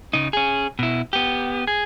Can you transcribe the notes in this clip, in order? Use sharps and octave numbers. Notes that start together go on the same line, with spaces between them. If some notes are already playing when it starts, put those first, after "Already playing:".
C#3 D#4
C#4 G#4
B2 E4
B3 G4
G#4